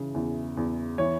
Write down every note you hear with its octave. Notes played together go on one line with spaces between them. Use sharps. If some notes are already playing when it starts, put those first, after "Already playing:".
Already playing: C#3 E3
E2
E2
E3 C#5